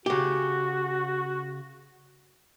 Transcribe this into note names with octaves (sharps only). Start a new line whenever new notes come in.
C#3 F#4 G4